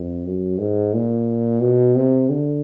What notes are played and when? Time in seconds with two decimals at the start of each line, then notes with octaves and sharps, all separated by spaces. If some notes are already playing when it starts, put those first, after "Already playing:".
Already playing: F2
0.26 F#2
0.60 G#2
0.94 A#2
1.61 B2
1.96 C3
2.30 D3